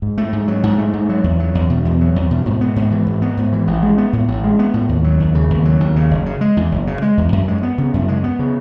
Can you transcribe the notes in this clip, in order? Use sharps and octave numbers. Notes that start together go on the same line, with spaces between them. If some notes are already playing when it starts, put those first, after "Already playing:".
G#2
A3
G#2
F#3
G#2
A3
G#2
F#3
E2
F#3
E2
B2
E2
F#3
E2
B2
G#2
B3
G#2
E3
G#2
B3
G#2
E3
A1
G#3
B3
A2
A1
G#3
B3
A2
D#2
F#3
D#2
C#3
D#2
F#3
D#2
C#3
F#1
C#3
G#3
E2
F#1
C#3
G#3
E2
F#2
G#3
B3
C#3
F#2
G#3
B3
C#3